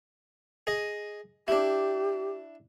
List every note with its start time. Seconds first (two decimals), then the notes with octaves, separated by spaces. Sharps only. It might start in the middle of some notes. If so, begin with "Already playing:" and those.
0.67 G#4 D#5
1.48 D4 E4 G4